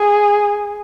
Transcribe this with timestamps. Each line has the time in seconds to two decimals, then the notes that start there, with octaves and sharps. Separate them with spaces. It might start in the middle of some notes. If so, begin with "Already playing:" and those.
Already playing: G#4